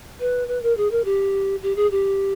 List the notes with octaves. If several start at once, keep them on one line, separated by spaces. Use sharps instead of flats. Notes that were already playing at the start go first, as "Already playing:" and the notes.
B4
B4
A#4
G#4
A#4
G4
G4
G#4
G4